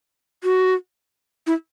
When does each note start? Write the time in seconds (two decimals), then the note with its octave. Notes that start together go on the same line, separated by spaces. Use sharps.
0.44 F#4
1.47 E4